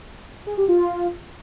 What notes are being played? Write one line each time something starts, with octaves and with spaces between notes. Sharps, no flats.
G#4
G4
F4